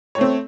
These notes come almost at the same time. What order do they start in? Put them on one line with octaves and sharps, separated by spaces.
C#5 A3 C4